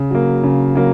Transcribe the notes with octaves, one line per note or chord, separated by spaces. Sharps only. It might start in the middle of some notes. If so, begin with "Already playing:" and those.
Already playing: C#3
F#3 A#3
C#3
F#3 A#3